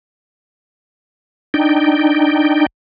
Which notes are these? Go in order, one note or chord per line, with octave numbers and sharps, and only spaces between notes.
D4 D#4 G5